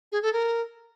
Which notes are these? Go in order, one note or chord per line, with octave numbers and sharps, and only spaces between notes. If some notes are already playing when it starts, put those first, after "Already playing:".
G#4
A4
A#4